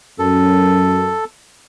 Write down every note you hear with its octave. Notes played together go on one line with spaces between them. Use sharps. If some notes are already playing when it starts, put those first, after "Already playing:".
F#2 A4